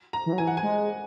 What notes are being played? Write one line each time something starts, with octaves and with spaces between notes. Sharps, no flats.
A#5
E3
F#3
E3 G#5
F#5
G#5
G#3